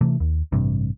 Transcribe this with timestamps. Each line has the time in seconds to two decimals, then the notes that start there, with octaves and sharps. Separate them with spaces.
0.01 C3 E3 A3
0.20 D#2
0.52 A1 G2 C3